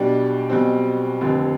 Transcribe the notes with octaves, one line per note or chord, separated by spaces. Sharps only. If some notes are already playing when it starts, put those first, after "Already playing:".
Already playing: B1 B2 G3 D4 G4
B1 B2 G3 C4
F1 D#2 D3 F3 C4